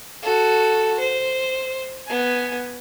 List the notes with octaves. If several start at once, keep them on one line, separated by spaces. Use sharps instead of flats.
F#4 A4
C5
B3 G#5